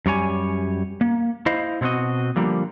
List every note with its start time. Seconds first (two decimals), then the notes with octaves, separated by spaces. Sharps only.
0.06 F#2 G3 C#5 G#5
1.01 A#3
1.46 E4 C5 D#5 F5
1.81 B2 C4 E4 F#4 D#5
2.36 D3 F3 G3 A#3